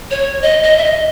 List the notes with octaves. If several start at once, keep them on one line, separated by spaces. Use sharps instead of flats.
C#5
D#5
D#5
E5
D#5